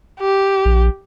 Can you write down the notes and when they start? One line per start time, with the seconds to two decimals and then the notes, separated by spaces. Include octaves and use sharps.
0.20 G4
0.65 A#1